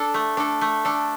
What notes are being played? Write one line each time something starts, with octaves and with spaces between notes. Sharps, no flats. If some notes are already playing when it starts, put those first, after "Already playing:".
Already playing: D4 A4
A3
D4 A4
A3
D4 A4